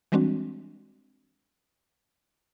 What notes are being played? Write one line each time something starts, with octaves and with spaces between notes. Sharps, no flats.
E3 G3 G#3 C4 D4 F#4